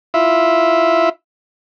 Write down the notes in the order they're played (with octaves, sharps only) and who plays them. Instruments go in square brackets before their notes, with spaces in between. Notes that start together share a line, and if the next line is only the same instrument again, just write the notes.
[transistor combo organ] E4 F4 E5